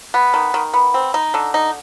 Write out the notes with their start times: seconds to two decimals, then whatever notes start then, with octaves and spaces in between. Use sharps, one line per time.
0.14 B3
0.34 D#3
0.54 D#3
0.73 B3
0.94 C4
1.14 D#4
1.34 D3
1.54 D#4